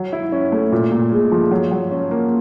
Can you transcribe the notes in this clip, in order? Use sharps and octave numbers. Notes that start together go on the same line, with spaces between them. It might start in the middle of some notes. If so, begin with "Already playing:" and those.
Already playing: F#3
E4
C#4
A3
A#2
A#2
G#3
F3
F#3
F#3
C#4
A#3